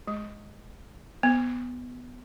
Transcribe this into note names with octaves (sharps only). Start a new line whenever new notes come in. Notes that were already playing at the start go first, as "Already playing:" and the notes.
G#3
B3